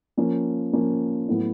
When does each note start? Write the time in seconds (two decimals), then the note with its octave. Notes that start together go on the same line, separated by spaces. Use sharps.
0.17 F3 A#3 C#4
0.73 F3 A#3 C#4
1.28 A2 F#3 B3 E4